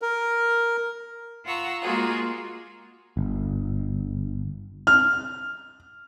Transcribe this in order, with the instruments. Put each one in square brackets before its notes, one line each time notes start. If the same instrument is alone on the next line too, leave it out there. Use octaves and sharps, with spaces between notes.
[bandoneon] A#4
[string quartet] F4 F#5 A#5 C#6 E6
G#3 A#3 F4 F#4 G#4
[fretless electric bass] G1
[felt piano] F6